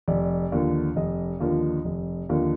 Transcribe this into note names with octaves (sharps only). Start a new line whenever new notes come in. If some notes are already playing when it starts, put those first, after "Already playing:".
F1 D5
D#2 D3 F3
F1 D#5
D#2 D3 F3
F1
D#2 D3 F3